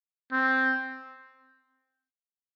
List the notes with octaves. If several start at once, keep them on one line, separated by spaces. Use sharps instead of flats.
C4